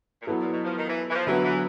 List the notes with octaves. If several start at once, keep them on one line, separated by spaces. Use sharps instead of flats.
A#2
B2 F#3 B3 E4 A4
A#2
B2
F3
D#3
E3
E3
F3
D3 E3 F#3 B3
E3